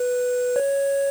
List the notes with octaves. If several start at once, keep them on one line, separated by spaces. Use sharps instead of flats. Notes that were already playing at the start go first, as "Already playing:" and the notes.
Already playing: B4
C#5